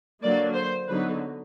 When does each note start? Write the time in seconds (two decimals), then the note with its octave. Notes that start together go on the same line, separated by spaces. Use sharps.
0.23 D3 F#3 A#3 D5
0.56 C5
0.88 D3 F#3 B3 D#4 B4